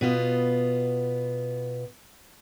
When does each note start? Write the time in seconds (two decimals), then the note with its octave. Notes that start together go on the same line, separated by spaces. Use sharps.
0.01 B2 B3 F4